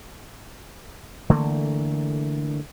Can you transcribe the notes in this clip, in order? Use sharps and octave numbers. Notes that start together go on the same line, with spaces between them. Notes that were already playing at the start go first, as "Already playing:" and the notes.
D3 E3 A3 A#3